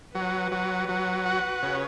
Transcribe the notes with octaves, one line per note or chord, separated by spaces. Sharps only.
F#3 B4
F#3
F#3
F#4
C#3